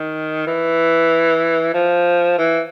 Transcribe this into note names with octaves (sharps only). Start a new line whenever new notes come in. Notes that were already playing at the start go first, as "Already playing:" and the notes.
Already playing: D#3
E3
F3
E3